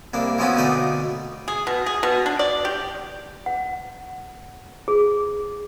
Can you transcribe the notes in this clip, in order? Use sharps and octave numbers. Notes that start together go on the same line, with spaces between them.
C2 A#3 D4
E3 F3 B3 C#4 F4 F#4
D2 B2 A3 D#4 D5
G#4
B2
G#4
B2
D4
D5
G4
F#5
G#4